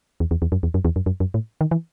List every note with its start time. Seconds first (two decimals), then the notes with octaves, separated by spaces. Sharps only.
0.20 E2
0.31 E2
0.42 E2
0.52 F#2
0.63 E2
0.74 F#2
0.85 E2
0.96 F#2
1.06 F#2
1.20 F#2
1.34 A2
1.61 D#3
1.71 E3